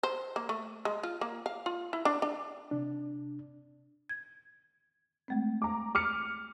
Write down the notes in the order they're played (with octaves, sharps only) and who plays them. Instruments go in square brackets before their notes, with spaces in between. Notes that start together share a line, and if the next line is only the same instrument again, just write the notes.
[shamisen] C5
A#3
A3
G#3
F4
A#3
F5
F4
E4
D4
D4
[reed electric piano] C3 D4
[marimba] G#6
G#3 A3 C4
[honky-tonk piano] A#5 D6
D6 F6 C#7